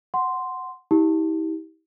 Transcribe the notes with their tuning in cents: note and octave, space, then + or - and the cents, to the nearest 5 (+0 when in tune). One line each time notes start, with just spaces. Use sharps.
F#5 +0 C6 -5
E4 -45 G4 +0